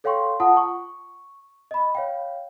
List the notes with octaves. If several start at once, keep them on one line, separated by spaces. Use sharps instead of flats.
A4 C#5 F5 G5 C6 C#6
F4 F#5 A5 D#6
C#6
D#5 B5
C#5 F5 G5